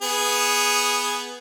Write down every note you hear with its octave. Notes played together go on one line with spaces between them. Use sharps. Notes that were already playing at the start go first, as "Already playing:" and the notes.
B3 G#4